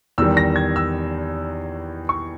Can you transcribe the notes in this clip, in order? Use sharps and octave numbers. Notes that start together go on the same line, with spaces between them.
E2 D#3 G3 E6
A#6
G#6
E6
C#6